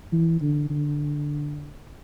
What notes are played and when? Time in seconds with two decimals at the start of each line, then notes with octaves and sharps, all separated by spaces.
0.13 E3
0.41 D3
0.70 D3